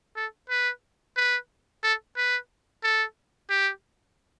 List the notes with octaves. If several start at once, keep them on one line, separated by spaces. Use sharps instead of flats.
A4
B4
B4
A4
B4
A4
G4